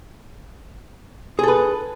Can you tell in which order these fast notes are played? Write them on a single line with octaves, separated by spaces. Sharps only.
G#4 A4 B4